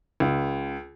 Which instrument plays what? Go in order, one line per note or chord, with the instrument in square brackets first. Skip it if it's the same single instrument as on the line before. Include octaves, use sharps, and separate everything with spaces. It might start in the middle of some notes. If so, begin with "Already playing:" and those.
[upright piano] C#2